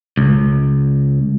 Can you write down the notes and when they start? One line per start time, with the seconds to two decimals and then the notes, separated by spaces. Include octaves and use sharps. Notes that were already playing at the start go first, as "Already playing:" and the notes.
0.17 C#2